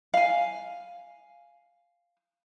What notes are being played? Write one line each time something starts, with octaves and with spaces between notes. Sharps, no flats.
F5 G#5